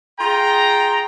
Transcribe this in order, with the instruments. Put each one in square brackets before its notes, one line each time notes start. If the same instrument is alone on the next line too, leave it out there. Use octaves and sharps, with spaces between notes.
[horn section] F4 G#4 G5 A#5